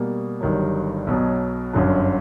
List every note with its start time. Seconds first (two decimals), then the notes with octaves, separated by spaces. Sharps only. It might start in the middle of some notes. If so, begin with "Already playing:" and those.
Already playing: B2 G3 A#3
0.41 G1 G2 D#3 F#3
1.07 B1 B2 F#3
1.73 G1 F#2 D3 F#3